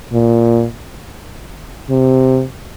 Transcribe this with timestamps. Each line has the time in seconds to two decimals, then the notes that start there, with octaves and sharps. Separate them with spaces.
0.13 A#2
1.90 C3